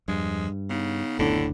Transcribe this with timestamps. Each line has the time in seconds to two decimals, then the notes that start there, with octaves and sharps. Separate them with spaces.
0.08 E2 G2 F3 G#3
0.70 C#3 B3 D#4
1.19 F#1 D2 A2 D3 D4